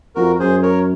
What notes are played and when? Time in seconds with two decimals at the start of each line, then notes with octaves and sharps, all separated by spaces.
0.16 F2 F#4 A#4
0.39 F#2 G#4 C5
0.63 A#4 C#5